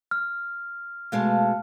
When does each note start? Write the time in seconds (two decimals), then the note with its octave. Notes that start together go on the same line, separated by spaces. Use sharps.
0.11 F6
1.12 B2 G#3 A3 F5 A5